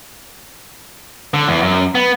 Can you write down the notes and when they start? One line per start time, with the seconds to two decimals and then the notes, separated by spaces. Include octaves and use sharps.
1.34 D3
1.48 E2
1.62 F#2
1.95 B3